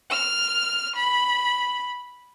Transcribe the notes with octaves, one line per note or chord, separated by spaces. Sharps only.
F6
B5